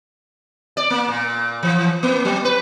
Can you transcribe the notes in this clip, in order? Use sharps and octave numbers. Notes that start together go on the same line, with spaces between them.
D5
A#3
A#2
E3
A#3
F#3
B4